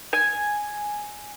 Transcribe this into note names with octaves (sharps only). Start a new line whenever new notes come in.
G#5